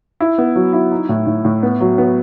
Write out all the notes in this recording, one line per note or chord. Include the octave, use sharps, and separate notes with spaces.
E4
B3
F#3
E4
D#4
A2
A2
A2
B3
F#3
B3